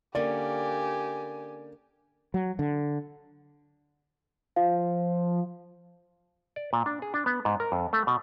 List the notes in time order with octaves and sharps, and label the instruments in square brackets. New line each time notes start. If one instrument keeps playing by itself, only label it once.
[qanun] D3 A#3 C#4 [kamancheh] G4 G#5 [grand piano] D5
[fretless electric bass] F#3
D3
[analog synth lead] F3 [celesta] F5
[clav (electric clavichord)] D5
A#2
D4
G#4
D4
B3
G#2
A#4
F2
A3
B2